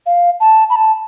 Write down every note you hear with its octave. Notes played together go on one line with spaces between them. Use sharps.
F5
A5
B5
A5